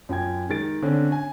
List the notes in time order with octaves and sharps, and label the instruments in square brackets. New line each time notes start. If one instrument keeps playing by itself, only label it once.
[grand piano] F#2 F4 G5 G#6
D#3 G#3 A6 D7
D3 C4 C#4
G#5